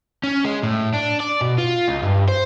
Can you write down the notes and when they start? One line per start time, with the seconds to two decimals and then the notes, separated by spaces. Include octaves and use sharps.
0.23 C#4
0.45 G#3
0.64 A2
0.93 D4
1.20 D5
1.41 B2
1.58 F4
1.88 C#2
2.03 G2
2.28 C5